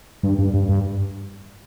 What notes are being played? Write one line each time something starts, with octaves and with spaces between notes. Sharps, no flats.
G2
G2
G2
G2